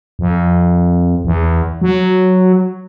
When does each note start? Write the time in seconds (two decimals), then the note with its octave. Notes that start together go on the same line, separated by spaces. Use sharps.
0.19 F2
1.25 E2
1.82 F#3